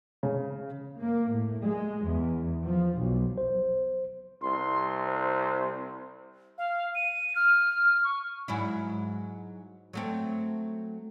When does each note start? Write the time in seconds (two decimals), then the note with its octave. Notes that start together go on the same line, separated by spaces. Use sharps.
0.23 C#3
1.00 A#3
1.31 A2
1.64 G#3
2.06 E2
2.64 F3
2.98 B1
3.38 C5
4.43 C2 C6
5.05 C5
6.58 F5
6.95 D#7
7.36 F6
8.04 C#6
8.48 G#2 F#3 E4
9.93 F#3 A3 C4